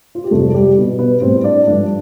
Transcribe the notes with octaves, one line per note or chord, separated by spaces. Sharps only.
F4
G4
F2 C3 G3 A3 A4
A4
G3 G4
B2 G3
B3 B4
A2 G3 C4 C5
D4 D5
G2 F3 A3 D4 D5